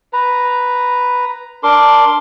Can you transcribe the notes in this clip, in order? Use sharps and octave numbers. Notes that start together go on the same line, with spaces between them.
B4 A#5
D4 A#4 C6 D6